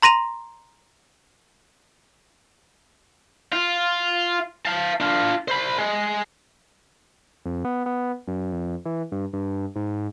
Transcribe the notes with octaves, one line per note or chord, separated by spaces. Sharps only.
A#5 C6 A#6 D#7 F7
F4
F5 A5
D4 F4
C5 B5
G#3
F2
B3
B3
F#2
F2
E3
G2
G2
G#2